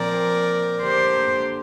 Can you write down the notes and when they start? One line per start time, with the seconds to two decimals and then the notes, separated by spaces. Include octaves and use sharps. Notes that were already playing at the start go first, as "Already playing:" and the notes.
Already playing: A#2 F3 C4 A#4 D5
0.82 D3 A#3 G4 C5